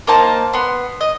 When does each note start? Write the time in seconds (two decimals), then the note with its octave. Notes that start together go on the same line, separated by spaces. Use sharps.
0.07 A#3 D#4 C5 A5
0.53 B3 C6
1.01 D#5